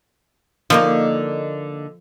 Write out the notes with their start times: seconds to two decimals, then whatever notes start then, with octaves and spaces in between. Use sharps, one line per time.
0.70 D3 F3 A#3 D#4